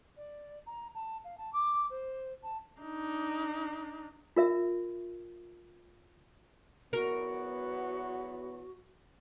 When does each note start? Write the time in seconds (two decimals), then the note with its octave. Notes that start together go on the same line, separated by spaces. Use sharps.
0.16 D5
0.66 A#5
0.94 A5
1.24 F5
1.37 A5
1.52 D6
1.89 C5
2.43 A5
2.81 D4 D#4
4.36 F4 A#4 E5
6.93 E2 F#3 B3 F#4 A#4